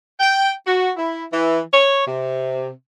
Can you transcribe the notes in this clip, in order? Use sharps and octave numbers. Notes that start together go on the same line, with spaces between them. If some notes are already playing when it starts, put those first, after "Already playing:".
G5
F#4
E4
E3
C#5
C3